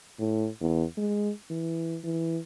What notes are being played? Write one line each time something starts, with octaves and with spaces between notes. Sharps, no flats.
A2
E2
G#3
E3
E3